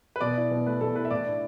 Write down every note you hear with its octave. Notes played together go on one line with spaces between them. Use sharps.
B4
B2 D5
E4
B2
A3 B4
B2 A4
E4 B4
E5
A2 D5
D4